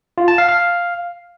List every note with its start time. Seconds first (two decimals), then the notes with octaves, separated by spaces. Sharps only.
0.18 F4
0.28 A5
0.38 F5
0.49 F5